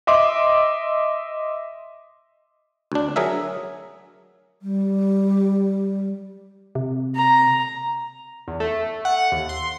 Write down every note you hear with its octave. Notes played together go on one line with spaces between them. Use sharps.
D#5 E5 C6 D6
D2 D4
F#3 G#4 A#4 E5
G3
C3
A#5
E2
A3
F#5
D#2
C6